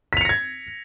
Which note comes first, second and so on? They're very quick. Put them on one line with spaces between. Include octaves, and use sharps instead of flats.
B6 F7 C#7 A#6 G#6